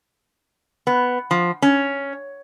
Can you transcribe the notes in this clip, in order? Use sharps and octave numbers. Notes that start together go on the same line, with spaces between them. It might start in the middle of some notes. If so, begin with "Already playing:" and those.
B3
F3
C#4